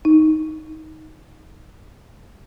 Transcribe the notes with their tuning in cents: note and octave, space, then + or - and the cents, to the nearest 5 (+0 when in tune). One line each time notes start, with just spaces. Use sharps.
D#4 +10